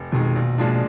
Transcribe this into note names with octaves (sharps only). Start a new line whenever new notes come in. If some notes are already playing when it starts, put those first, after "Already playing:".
Already playing: F1
F2 B2 D#3 G#3
A#1
A#2 F3 G#3 D4